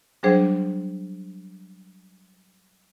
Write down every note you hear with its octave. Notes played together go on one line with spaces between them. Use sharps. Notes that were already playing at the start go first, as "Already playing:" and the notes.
F#3 G3 D4 G#4 C5